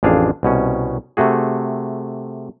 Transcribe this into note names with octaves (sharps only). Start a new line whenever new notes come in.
A1 F2 D4 G#4 F5
C2 B2 C#4
C3 A3 F#4 G#4